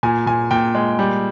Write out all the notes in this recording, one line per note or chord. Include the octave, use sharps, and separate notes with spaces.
A#2 G#5
A#2 G#5
A#2 G5
G#3
G3